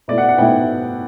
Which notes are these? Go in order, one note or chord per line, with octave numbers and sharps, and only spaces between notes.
B2 A3 E4 D5
F#5
F#5
B2 A3 E4 G5